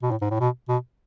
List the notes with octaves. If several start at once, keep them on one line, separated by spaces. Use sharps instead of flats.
B2
A2
G#2
A2
B2
B2